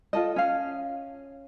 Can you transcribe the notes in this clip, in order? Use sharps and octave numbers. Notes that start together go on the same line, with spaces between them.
F4 A4 D#5
C#4 F5